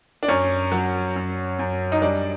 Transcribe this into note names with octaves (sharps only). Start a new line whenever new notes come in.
D4
F#2 C#4
F#3
F#2
F#2
D#4
G3 D4